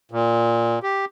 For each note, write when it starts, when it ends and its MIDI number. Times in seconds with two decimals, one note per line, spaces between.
0.12 0.79 46
0.83 1.05 67